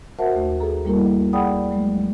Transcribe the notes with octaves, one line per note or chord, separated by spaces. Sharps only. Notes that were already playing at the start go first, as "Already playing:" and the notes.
F#4 A#4 C5 E5 F#5 A5
D#2 A3
G#4 A4 A#5
G3 A3 A#3 E4 A#4
G#4 D5 F#5 G5 B5 D#6
F#3 G#3 A3